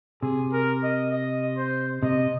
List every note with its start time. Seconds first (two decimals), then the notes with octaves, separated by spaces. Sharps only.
0.22 C3 G#4
0.53 A#4
0.83 D#5
1.12 D#5
1.57 C5
2.03 C3 D#5